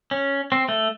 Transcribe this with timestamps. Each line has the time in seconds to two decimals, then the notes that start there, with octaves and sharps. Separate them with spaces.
0.11 C#4
0.52 C4
0.69 A3